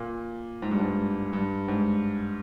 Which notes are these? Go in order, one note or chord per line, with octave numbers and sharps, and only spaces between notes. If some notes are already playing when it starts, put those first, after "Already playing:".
Already playing: A#2
G#2
G2
G#2
G2
G#2